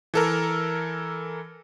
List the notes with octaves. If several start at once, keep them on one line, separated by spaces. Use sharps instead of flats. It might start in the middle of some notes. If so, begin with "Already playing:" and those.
E3 A4 A#4